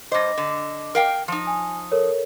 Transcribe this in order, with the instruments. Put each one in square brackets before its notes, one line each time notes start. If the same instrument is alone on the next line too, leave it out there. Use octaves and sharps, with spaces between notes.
[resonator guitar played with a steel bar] G2 C5 [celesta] D#5 D6 A#6
[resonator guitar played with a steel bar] D3
A#4 F5 G5
F3 D#4
[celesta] G#5
A4 A#4 C#5